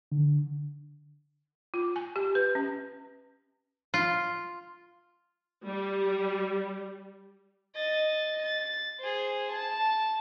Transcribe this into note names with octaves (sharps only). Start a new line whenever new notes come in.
D3
F4
G#5
G4
B4
C#4
F4
G3
D#5 A6
A6
G#4 C5
A5